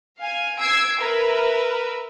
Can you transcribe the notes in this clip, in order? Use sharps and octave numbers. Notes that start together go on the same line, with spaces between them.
F5 G#5
E6 G#6 C7 D7
A#4 B4 E5